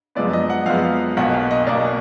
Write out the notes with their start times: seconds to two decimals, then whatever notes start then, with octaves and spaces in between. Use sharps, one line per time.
0.15 F#2 F3 G#3 B3 D5
0.33 D#5
0.50 F#5
0.66 F#2 F3 G#3 B3 F5
1.17 B1 B2 A#3 F#5
1.33 F5
1.51 D#5
1.67 B1 B2 A#3 D5